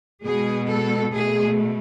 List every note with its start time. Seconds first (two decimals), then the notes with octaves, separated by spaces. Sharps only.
0.25 B2 G#3 G#4
0.68 A4
1.12 B2 A3 G#4